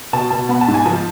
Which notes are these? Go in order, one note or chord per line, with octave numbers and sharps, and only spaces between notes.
B2 A5
B2 A5
B3 B5
A5
G#2
G#5
F3 A5